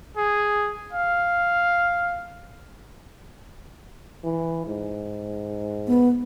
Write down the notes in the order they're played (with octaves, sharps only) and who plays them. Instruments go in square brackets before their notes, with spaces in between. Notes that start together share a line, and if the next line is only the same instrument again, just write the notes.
[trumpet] G#4
F5
[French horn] E3
G#2
[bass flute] B3